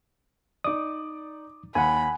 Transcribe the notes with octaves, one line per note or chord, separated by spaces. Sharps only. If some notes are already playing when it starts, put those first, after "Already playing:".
D#4 D5 D6 D#6
D#2 F#5 G#5 B5